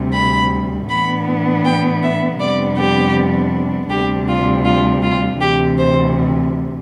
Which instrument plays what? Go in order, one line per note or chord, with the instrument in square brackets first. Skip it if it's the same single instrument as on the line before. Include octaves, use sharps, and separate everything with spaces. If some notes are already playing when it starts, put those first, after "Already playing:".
Already playing: [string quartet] D2 C3 G3
B5
A2 E3 B3 D4 B5
G5
E5
F2 C3 G3 B3 D4 D5
G4
D2 C3 G3 D4 G4
F4
F4
F4
D2 C3 E3 G4
C5